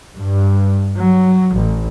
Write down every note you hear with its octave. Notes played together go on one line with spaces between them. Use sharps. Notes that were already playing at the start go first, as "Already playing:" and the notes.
G2
F#3
A1